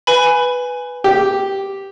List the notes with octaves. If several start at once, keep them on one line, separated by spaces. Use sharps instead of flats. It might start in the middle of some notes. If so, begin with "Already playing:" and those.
B4 G#5 B5
G4